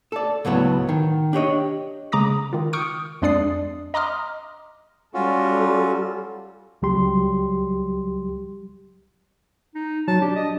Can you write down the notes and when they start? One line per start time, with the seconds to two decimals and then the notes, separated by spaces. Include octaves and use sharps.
0.12 A4 D5
0.45 C#2 A2 F#3 B3
0.89 D#3
1.33 D4 G4 C#5 D#5
2.12 C#3 G#3 A#5 D6 D#6 A#6
2.53 D#3 F4
2.73 C#6 D#6 F6 G6 C#7 D7
3.22 F2 G#3 D4 D5 D#6 C7
3.94 D#5 A#5 C6 D6 D#6 F6
5.14 G3 C#4 F4 F#4 A4
6.82 C#2 F#3 G3 G4 C6
9.75 D#4
10.08 F#3 A5
10.22 D4 G4
10.36 D#5